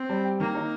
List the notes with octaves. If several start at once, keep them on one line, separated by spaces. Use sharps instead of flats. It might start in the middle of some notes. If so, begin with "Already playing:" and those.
Already playing: C4
G3
G4
D#3 A#3
D#4